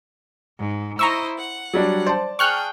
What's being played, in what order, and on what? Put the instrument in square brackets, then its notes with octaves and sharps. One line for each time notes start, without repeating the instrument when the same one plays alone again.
[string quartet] G#2
[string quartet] E4 C5 D#5 [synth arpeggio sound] A#5 C#6 E6
[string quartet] F#5
[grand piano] F#3 G3 D4
[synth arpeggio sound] C5 [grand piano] D5 A5
[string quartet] G#4 G5 [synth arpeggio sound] C#6 F6 F#6